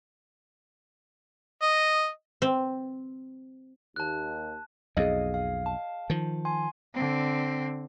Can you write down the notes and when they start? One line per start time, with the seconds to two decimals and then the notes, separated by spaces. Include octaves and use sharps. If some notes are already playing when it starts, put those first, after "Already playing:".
1.62 D#5
2.42 C4
3.96 D#2 A5 F#6
4.97 B1 F2 G#4 D#5 F5
5.34 F5
5.66 A5
6.10 D#3 F3
6.45 G#5 C6
6.94 D3 C4